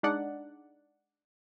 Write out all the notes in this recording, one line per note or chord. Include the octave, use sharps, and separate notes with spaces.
G#3 D4 D#4 D5 F#5